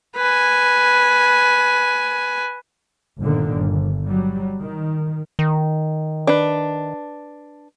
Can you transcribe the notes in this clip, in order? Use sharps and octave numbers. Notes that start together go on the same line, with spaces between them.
B4 G#5
G1 A#2 D3 D#3
G1
F#3 G3
D#3
D#3
D4 B4